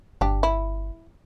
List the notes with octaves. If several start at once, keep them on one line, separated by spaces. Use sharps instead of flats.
G1 D4 G4
E4